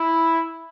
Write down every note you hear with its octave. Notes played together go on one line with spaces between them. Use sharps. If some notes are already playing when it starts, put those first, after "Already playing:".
Already playing: E4